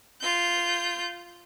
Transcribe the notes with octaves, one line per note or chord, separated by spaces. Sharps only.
F4 G6